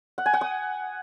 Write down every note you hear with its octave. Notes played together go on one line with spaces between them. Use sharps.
F#5
G#5
F#5
D#6